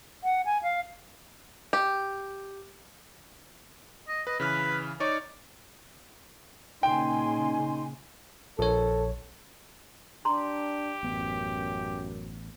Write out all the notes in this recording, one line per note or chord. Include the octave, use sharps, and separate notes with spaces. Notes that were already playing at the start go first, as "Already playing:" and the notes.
F#5
G#5
F5
G4
D#5
B4 D#5
C#3 E3 B4 F6
D#4 C#5 D5 C#6
A#2 C#3 D#4 G5 G#5 C6
A#1 A4 C#5
D4 G4 A#5 C6
A1 F#2 B3